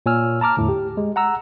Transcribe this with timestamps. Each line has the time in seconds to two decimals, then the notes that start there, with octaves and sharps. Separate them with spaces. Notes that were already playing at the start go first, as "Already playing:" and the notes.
0.06 A#2 C#5 G#5 E6 F6
0.41 A5 A#5 D6 F6
0.57 E2 A2 D3
0.69 G4
0.97 G#3
1.16 F#5 A#5 E6